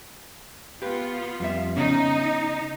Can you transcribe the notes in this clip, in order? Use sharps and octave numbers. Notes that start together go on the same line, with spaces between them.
B3 F4 G4 B4
F2 G3 E5
C#3 B3 C#4 D#4